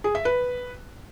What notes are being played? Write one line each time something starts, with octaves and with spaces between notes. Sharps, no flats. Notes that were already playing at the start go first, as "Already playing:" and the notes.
G#4
E5
B4